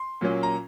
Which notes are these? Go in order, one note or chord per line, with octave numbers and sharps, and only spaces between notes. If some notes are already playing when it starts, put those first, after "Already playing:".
Already playing: C6
A#2 F#3 A#3 C#4
A#5